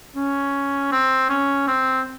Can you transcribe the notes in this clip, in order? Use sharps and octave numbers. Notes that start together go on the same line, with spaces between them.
C#4
C4
C#4
C4